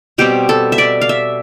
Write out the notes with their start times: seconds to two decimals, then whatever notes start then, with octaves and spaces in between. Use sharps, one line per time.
0.18 B2 G3 C4 G4
0.49 A4
0.72 E5
0.78 D5
1.01 F5
1.09 E5